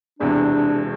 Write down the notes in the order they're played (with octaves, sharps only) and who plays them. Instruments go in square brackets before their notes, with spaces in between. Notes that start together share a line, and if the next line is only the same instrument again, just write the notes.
[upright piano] E1 E2 C3 [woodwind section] D4